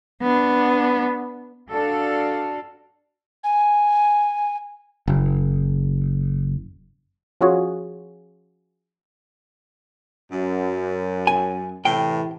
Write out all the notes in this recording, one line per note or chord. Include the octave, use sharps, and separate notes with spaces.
B3 D4
D4 F#4 A4 D5 F5
G#5
F#1
F3 C#4 F4 F#4 G#4 C#5
F#2
G#5
A2 C3 E3 G5